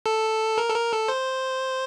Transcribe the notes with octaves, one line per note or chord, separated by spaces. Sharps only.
A4
A#4
A4
A#4
A4
C5